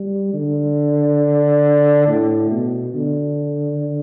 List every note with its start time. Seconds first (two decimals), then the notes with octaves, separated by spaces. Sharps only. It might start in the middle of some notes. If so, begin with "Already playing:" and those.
Already playing: G3
0.33 D3
2.08 A2
2.51 B2
2.94 D3